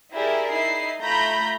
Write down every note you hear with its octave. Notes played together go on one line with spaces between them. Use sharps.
E4 G4 G#4 A#4 D5 E5
D#4 E4 C7
A3 F4 A#5 B5 G6